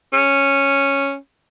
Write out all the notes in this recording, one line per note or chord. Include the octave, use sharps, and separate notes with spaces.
C#4